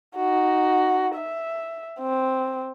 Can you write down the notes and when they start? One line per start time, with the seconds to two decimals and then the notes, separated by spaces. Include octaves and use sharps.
0.16 D#4 F#4
1.16 E5
1.99 C4